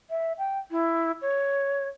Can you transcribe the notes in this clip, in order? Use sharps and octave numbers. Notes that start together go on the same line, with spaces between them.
E5
G5
E4
C#5